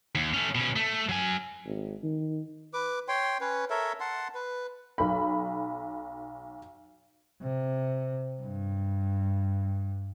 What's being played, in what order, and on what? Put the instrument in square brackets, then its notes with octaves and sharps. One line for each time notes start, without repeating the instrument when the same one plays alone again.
[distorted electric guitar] D#2
A3 C#4
B2 C#4
A3
F#3 G#5
[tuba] G#1
D#3
[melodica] B4 D6
C#5 G5 C6
C#4 B4 C#5
A4 A#4 C#5 E5
F#5 A5 C6
B4
[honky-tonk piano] B1 B5
[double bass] C3
G2